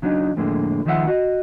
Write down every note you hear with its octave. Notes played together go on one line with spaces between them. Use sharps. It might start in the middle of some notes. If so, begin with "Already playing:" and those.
C#3 F#3 D4 D#4
F2 A2 D3 G#3 A#3
C#2 D#3 F3 F4 E5 F#5
F#4 D#5